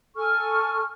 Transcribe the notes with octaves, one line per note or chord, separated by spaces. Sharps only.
A4 G#5 C#6 F6